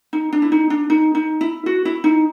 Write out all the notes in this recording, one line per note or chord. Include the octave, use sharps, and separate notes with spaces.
D#4
D4
E4
D#4
D4
D#4
D#4
E4
F#4
E4
D#4